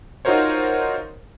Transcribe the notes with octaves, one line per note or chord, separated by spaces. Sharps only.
D#4 F4 F#4 A#4 C5 C#5